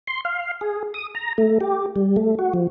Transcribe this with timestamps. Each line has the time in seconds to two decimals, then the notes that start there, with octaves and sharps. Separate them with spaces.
0.07 C6
0.25 F5
0.61 G#4
0.94 D#6
1.15 A#5
1.38 A3
1.61 G4
1.96 G3
2.16 A3
2.39 F#4
2.53 F3